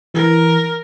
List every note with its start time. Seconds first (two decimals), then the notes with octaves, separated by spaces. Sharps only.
0.14 E3 A#4